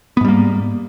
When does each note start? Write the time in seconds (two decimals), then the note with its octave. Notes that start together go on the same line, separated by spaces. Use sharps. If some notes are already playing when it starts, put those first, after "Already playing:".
0.17 B3
0.21 G#2
0.25 G3
0.28 A#3